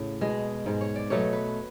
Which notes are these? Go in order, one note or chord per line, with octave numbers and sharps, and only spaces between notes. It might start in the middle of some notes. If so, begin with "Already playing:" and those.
Already playing: A2 C#3
B2 G#3
G#2 G#3
C#5
D5
B2 F#3 A3 C#5
B4